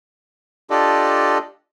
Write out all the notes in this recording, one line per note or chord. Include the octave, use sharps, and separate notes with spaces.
D4 F4 G4 A4 D5 D#5